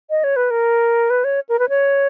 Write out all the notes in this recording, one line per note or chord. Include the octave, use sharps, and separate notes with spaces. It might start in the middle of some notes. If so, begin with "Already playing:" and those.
D#5
C#5
B4
A#4
B4
C#5
A#4
B4
C#5